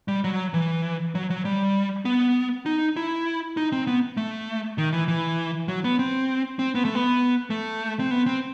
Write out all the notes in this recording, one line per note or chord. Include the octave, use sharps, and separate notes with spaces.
G3
F#3
E3
F#3
F#3
G3
B3
D#4
E4
D#4
C4
B3
A3
D#3
E3
E3
F#3
B3
C4
C4
B3
A3
B3
A3
C4
B3
C4